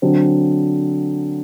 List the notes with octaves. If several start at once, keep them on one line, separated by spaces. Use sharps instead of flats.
D3 F#3 C4